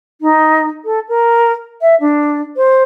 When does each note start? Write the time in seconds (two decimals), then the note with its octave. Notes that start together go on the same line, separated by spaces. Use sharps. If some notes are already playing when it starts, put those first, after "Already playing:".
0.21 D#4
0.85 A4
1.09 A#4
1.81 E5
2.00 D4
2.56 C5